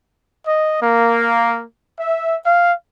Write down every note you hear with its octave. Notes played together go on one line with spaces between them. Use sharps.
D#5
A#3
E5
F5